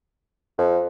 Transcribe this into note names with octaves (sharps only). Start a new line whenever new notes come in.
F2